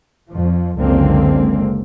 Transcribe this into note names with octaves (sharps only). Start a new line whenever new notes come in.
F2 F3
F#1 C#2 D3 G#3 A#3 C4